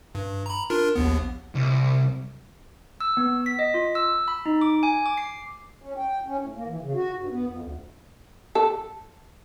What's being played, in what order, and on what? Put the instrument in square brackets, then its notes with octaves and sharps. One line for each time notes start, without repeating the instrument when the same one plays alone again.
[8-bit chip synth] G2
A#5 B5
D4 F4 A#4
A#1 D#2 B3
[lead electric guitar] C2
[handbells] E6
B3
B6
D#5
F4
E6
B5
D#4
D6
G#5
D6
C7
[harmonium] C#4
G5
C#4
A2
A#3
E3
C#3
F#4
G2
B3
F2
D2
[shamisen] A4